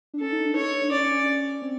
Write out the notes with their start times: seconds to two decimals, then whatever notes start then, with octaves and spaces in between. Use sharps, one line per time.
0.14 D4
0.21 C#4 A4
0.33 D#4
0.45 D4
0.56 D#4 C#5
0.82 D4
0.91 C#4 D5
1.62 C4